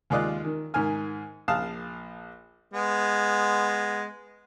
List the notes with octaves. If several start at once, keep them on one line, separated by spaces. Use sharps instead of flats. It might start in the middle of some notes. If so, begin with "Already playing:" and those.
D#2 G#3 F4 D5 D#5 F#6
D#3
G#2 D#3 A#4 G#5 F6
A#1 F5 A5 D#6
G#3 B3